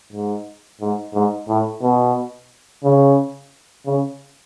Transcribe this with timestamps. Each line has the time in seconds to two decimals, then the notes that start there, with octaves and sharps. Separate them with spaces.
0.13 G#2
0.81 G#2
1.14 G#2
1.48 A2
1.82 B2
2.84 C#3
3.86 C#3